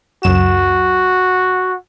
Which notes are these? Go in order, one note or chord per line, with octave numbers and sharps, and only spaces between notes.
C#2 F#2 F#4 E7